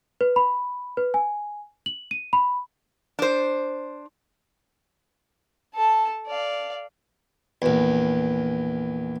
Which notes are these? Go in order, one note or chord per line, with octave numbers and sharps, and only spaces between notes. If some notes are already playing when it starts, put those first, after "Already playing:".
B4
B5
B4
G#5
F#7
D#7
B5
D4 C5
A4 A5
D5 F5
A#1 E2